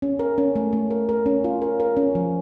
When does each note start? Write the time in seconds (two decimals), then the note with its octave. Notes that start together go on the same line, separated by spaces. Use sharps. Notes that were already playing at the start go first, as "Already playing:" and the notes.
0.02 C#4
0.19 A#4
0.38 C#4
0.56 A3
0.73 A3
0.91 A#4
1.09 A#4
1.26 C#4
1.44 F4
1.62 A#4
1.80 A#4
1.97 C#4
2.15 F3